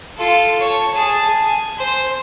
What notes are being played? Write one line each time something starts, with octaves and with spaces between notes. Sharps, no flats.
F4 A4
C#5 A5
G#4 A5
G#5
C5